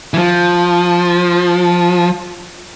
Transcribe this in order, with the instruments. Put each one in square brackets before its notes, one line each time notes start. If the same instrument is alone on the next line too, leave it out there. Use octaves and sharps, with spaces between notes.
[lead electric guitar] E3
F3